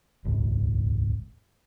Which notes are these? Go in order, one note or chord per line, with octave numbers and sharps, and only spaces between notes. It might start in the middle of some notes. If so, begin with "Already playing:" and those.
D#1 G#1 C#2